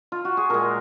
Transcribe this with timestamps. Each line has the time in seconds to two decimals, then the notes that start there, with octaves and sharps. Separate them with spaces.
0.12 F4
0.25 F#4
0.37 G#4
0.50 A#2 G#3 A#4